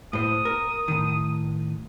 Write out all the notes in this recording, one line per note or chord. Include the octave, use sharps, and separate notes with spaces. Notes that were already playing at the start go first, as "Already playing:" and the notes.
A2 C5 D#6
A#4
A2 D#3